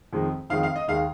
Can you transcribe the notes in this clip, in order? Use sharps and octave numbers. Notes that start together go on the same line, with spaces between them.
F2 D#3 G#3
F2 D#3 G#3 F5
F5
D#5
D#2 D#3 G#3 F5